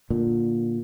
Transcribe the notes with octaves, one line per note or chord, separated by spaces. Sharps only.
A#2 D3